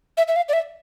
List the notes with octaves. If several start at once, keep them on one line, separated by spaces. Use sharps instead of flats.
E5
E5
F5
D5
E5